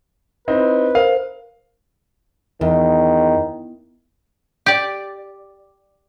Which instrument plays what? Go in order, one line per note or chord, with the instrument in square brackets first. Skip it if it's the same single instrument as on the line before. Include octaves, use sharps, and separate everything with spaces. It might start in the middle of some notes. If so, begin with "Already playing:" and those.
[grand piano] C4 D#4 E4 [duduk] B4
[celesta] A#4 C5 [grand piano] F5
[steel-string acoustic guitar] E2 [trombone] D#3
[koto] G4 D5